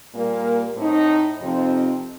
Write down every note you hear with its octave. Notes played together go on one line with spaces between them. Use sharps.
A#2 G3 A#3
A2 A3 C4 D#4
F2 C3 F3 C4 D#4